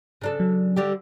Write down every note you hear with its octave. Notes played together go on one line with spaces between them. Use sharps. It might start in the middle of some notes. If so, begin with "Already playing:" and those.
C#3 D4 A4
F#3
D3 G3 G4